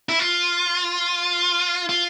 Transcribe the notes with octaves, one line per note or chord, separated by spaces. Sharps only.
E4
F4
F4